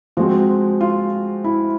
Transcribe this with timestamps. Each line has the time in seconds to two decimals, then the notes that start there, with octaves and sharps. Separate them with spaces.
0.17 F3 G#3 C4 F#4
0.81 F4
1.44 E4